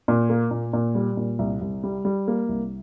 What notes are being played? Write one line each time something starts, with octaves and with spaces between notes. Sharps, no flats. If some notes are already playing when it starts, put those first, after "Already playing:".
A#2
A#3
A#2
A#2
G3
A#2
C2
C2
G3
G3
A#3
C2